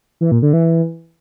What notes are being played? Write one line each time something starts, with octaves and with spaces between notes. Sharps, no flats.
E3
A#2
D3
E3